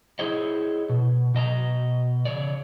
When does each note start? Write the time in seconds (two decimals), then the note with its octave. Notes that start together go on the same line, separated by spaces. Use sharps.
0.19 E4 G#4 C5 C#5 D#5
0.90 B2
1.34 B2 D#5 A5 A#5
2.25 C#3 C#5 D5